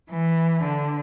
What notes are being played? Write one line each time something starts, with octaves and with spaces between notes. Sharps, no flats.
E3
D3